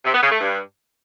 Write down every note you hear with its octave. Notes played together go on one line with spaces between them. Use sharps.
C3
B3
C#3
A3
G2